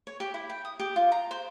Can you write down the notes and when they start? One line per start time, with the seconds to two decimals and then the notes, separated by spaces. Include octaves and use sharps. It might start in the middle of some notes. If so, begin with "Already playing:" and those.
0.07 C#5
0.20 G4
0.34 E4
0.50 G5
0.65 D#6
0.80 G4
0.96 F4
1.12 A#5
1.31 C5